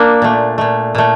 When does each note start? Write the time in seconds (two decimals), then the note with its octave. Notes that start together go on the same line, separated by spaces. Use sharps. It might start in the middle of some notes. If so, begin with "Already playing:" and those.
Already playing: A#3 D4
0.22 A#2 A3
0.58 A#2 A3
0.95 A#2 A3